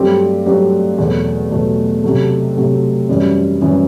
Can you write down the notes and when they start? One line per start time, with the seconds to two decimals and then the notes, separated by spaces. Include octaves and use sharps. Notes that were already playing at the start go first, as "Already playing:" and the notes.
Already playing: G2 F#3 A3 C4 G4
0.46 G2 F#3 A3 C4 G4
0.98 E2 B2 F#3 A3
1.51 E2 B2 F#3 A3
2.04 C3 F#3 A3
2.56 C3 F#3 A3
3.09 F#2 E3 G3
3.61 F#2 E3 G3